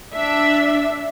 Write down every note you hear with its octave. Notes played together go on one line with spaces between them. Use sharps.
D4 E5